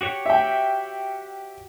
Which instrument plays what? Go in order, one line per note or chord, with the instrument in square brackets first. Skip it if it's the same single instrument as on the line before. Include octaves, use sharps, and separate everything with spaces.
[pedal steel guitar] F#4 G4 C#5
[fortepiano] E5 G5